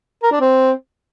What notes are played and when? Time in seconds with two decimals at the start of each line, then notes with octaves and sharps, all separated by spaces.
0.23 A#4
0.32 D4
0.41 C4